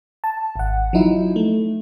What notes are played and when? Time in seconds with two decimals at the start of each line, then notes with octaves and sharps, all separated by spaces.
0.24 A5
0.56 G#1 F#5
0.93 F3 F#3 D#4 E4
1.36 A3